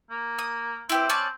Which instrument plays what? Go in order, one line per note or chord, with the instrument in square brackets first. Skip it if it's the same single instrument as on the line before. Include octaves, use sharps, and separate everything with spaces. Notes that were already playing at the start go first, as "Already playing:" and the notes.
[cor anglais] A#3
[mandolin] D#6
[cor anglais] C4 [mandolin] E4 G4 B4
[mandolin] C#4 D5 A5